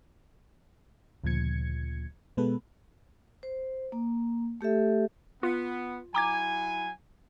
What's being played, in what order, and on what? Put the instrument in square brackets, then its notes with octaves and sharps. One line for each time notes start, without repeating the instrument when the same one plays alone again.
[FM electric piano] D2 A#2 C#3 F3 G#6 C#7
B2 G#3 B3 A4 B4
[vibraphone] C5
A#3
A3 G4 A4 E5
[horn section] B3 [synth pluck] F4
[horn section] F#3 E4 G#5 [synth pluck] A#5 D6 G#6